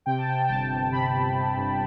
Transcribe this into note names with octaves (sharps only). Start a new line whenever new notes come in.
C3 G5
A5
C3 G5
G5
G1 A5
G1
C3 B5
C3
C3
G1